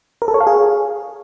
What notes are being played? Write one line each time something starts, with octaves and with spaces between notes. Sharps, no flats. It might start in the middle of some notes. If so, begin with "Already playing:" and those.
A#4
A4
C#5
F5
G#4